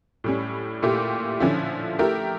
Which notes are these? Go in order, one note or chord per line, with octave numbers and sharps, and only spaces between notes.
A2 G3 C#4
A#2 A3 E4 G4
D3 F3 C#4 E4
A3 E4 G4 A#4